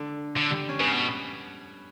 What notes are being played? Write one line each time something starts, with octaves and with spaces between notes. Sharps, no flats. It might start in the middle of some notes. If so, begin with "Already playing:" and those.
Already playing: D3
D3
G3
C#4
C#3 B3
B2